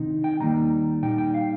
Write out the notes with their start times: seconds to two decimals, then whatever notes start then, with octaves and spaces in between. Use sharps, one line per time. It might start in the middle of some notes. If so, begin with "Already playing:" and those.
Already playing: C3 D#3 C4 D#4
0.24 G5
0.40 D#2 D#3 G3 A#3 D#4 A#5
1.03 A#2 G3 D#4 G5
1.18 G5
1.34 F5